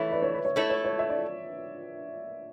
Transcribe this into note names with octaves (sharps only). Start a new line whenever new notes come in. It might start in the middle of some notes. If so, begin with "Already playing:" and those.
Already playing: E3 A3 E4 C#5 E5
B4 D5
C#5
B4
C#5
A3 E4 A4 C#5
C#5
C#5
E5
D5